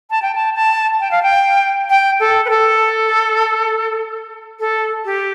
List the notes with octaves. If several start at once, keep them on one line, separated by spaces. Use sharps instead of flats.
A5
G5
A5
A5
G5
F5
G5
G5
A4
B4
A4
A4
G4